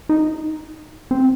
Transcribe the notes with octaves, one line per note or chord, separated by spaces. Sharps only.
D#4
C4